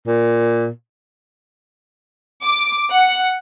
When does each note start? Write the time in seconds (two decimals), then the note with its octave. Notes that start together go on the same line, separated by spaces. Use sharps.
0.07 A#2
2.43 D6
2.90 F#5